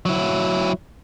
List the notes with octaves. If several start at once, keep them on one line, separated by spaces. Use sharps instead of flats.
F#3 E4